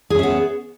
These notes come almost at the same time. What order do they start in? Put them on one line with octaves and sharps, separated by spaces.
G#4 C#4 E5 B3